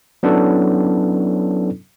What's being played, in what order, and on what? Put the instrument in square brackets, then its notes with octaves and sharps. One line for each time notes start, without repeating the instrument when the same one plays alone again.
[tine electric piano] F#3 B3 C#4 D4 E4 A4